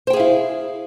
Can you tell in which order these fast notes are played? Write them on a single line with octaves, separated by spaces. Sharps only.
C5 G5 G#4 F5 E4